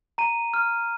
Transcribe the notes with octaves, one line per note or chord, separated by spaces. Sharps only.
A#5 D#7
F6